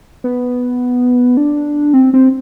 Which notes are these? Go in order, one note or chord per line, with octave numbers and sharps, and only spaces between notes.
B3
D4
C4
C4